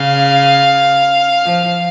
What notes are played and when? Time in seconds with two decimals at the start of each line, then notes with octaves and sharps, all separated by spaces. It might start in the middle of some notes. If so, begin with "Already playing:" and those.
Already playing: C#3 F5
1.44 F3